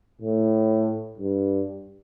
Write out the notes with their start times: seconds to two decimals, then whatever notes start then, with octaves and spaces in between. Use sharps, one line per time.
0.21 A2
1.17 G2